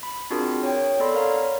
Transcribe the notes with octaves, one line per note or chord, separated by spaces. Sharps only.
B5
C4 D4 F4 F#4 G#4 A#4
C#5 G5
B3 A4 D5 B5 C6
A#4 C#5 F5 A#5